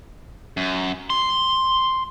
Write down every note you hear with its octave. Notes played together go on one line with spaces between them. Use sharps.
F#2
C6